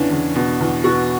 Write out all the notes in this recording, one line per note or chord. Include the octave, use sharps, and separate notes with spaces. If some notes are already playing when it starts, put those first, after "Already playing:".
Already playing: E2 C#3 E3 C#4 D4
E2
B2
E2
B2 F#4